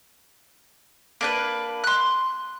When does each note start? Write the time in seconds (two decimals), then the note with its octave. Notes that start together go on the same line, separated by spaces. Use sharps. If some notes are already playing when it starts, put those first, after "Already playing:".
1.21 A#3 D4 B4
1.84 C6 F#6